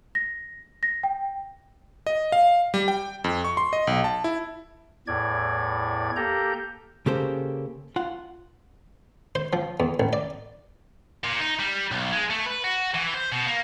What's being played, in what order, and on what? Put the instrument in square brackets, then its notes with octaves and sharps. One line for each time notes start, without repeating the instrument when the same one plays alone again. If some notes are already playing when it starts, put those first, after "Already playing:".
[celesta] A#6
A#6
G5
[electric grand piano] D#5
F5
G3
G5
F2
C#6
C6
D#5
B1
A5
E4
[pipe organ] E2 A2 D5 G#6
A#3 G4 A4 A#5 G6
[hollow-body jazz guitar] C#3 A#3 G4 A4 C5
F4 F#5
[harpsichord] C5
F3
E2
A1
D5
[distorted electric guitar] A#2
D#4
G3
B1
G#3
A3
B4
F#4
E3
C5
B2
A#3